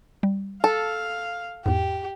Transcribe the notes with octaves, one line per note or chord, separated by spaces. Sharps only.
G3
A4 F5
E2 G#2 G4